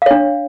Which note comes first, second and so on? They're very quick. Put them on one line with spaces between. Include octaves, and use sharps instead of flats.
F5 C#5 D4